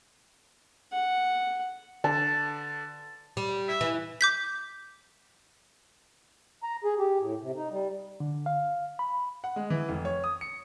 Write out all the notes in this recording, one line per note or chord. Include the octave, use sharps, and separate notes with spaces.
F#5
D3 A5
G3
E5
E3
D6 G6 B6
A#5
G#4
G4
A2
C3
D#4
G3
D3
F5
B5
F#5
G#3
E3
F1
C#5
D#6
C#7